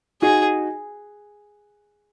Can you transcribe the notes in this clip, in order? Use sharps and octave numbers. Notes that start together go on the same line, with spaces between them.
D#4 F#4 G#4